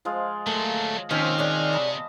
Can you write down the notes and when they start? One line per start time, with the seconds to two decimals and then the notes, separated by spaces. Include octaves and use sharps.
0.05 F3 G#3 F4
0.46 D2 F#3 A3 A#3
1.11 C3 D#3 F3 A#3 C4 C#4 F6
1.38 D4 G#4 C#5 D5
1.73 D#5 A5 B5